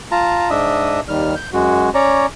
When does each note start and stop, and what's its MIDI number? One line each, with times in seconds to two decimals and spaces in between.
0.12 0.50 65
0.12 0.50 81
0.12 0.50 82
0.50 1.00 44
0.50 1.00 62
0.50 1.00 75
0.50 1.00 76
0.50 1.00 87
1.08 1.35 39
1.08 1.35 51
1.08 1.35 55
1.08 1.35 89
1.36 1.50 91
1.53 1.90 42
1.53 1.90 56
1.53 1.90 66
1.94 2.26 61
1.94 2.26 73
1.94 2.26 74
1.94 2.26 82